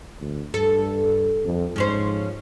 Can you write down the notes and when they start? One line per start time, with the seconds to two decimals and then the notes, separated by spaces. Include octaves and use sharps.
0.21 D2
0.54 G2 A4
1.45 F2
1.76 G#2 F3 C#4 C5